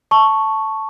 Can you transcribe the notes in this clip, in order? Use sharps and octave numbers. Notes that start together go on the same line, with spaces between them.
A5 C#6